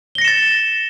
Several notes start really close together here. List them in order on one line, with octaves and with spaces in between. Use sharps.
G7 A#6 C#7 E7 A6